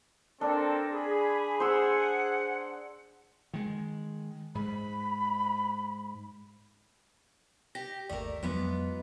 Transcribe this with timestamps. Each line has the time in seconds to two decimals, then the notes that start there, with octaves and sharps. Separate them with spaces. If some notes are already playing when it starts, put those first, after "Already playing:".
0.41 C4 D4 A4 A#4
0.93 G#4 B5
1.60 C5 F#5 E6
3.54 D#3 G#3
4.55 G#2 B5
7.75 G4 A#6
8.09 G1 D#2 A3 A#4 D5
8.43 F2 G#2 F#3 B3 F4